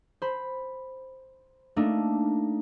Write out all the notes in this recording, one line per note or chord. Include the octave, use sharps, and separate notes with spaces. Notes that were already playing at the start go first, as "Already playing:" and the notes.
C5 B5
A3 A#3 D4 D#4